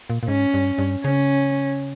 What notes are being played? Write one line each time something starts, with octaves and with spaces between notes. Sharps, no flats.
A#2
A#2
G#2 C#4
G2
G2
C#3 C#4